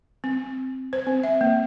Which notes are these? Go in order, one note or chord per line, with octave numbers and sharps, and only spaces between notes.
C4
C5
C4
E5
A#3